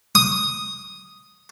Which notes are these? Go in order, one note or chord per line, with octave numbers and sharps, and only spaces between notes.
D#6